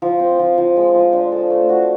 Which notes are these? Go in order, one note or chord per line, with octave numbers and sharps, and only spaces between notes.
F3
C4
F3
F3
G#3
F3
D4
A4
A3
F#4